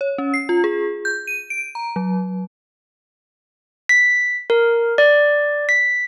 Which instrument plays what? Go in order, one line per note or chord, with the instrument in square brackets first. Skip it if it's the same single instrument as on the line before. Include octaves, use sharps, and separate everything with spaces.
[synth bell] C#5
C#4
C7
F4
G#4
G6
D#7
D7
A#5
F#3
[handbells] B6
A#4
D5
B6